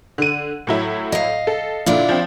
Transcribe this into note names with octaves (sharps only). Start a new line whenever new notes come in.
D3 D#7
A2 F#3 E4
D#5 F5
A4
A#2 D3 D4 E4 F4
F3 C4